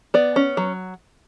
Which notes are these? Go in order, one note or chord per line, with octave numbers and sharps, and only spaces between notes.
B3 D5
C#4
F#3